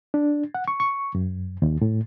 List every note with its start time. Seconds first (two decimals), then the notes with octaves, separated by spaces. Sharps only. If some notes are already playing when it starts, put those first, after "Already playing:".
0.14 D4
0.55 F#5
0.68 C#6
0.80 C#6
1.15 F#2
1.62 D#2
1.82 A2